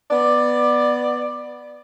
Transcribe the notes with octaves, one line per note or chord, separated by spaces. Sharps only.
B3 D5